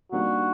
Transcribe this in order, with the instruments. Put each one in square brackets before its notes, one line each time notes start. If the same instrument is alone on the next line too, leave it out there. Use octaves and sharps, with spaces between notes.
[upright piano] D#3 G3 A#3 D4 [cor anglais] F#4